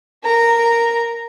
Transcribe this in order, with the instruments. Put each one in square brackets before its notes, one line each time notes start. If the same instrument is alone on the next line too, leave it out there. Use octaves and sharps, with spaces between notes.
[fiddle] A#4 A#5